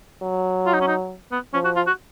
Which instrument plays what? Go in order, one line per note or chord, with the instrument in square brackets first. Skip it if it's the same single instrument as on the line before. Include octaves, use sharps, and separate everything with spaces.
[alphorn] F#3
[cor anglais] F4
D#4
C#4
D#4
B3
[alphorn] F3 [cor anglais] C#4
[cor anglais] F#4
F4
F#4